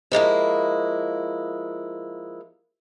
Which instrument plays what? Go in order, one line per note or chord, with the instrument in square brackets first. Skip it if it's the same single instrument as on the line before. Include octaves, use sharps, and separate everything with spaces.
[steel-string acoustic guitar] F3 G#3 A#3 E4